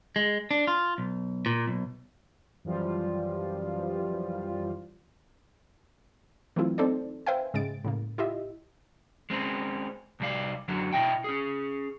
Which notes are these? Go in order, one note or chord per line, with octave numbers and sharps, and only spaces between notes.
G#3
D4
F4
B1
A#2
B1
F#2 E3 F3 G3 F4
E3 F#3 A3 C4 E4 F4
C4 D#4 A4 C5 D5
B4 C5 E5 F5 G5 G#5
G#2 C#3 G#3 A6 D7
A2 C#3 A#3
E4 F4 G4 D#5 E5
G#3 C4 C#4
C2 G3 F5
F#2 D3 F#3
B2 E4 D#5 E5 G5
C#4 G#4